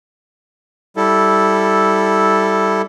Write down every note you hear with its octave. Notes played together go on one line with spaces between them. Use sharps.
G3 E4 A4